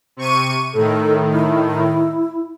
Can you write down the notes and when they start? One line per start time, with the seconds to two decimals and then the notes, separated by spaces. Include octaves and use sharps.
0.17 C3 C#6 D#7
0.74 A2 D#3 A4
1.32 E4